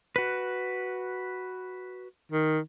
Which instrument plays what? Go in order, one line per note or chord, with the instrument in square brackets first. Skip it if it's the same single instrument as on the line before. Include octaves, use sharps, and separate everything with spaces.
[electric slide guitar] F#4 B4
[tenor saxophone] D#3